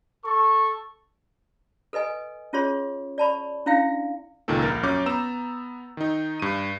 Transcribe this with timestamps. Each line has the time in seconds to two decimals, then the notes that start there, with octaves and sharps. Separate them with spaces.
0.25 A4 C#6
1.93 A4 B4 D#5 G#5
2.53 C#4 F4 G#4 C#5 C6
3.18 D5 A5 B5 C#6
3.66 C#4 D4 E4 E5 F5 G5
4.48 C#2 A#2 D#3 A#3 A4
4.62 A#1 A#3 A#4 A6
4.83 F#2 C#4 D6 G6
5.06 B3 A#5 E6 E7
5.97 D#3 D#4
6.40 G2 D#7